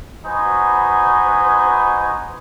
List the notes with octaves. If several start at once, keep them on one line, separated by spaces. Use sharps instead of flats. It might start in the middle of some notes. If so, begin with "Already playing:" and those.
B3 D#4 F#4 B4 C5 G#5